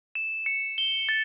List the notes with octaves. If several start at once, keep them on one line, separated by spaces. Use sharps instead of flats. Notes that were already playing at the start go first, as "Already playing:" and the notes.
E7
C#7
G7
A6